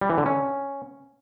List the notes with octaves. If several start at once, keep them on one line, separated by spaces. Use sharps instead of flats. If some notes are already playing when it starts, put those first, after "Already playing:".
G3
E3
D3
C#4